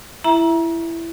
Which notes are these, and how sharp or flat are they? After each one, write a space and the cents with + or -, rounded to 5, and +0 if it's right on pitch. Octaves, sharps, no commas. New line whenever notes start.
E4 +15 E5 +0 A#5 +30